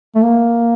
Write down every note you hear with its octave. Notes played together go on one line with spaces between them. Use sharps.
A3
A#3